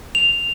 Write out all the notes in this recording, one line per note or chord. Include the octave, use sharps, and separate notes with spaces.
F7